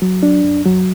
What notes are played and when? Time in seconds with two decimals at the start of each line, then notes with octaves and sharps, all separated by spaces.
0.02 F#3
0.23 D4
0.44 F#2
0.66 F#3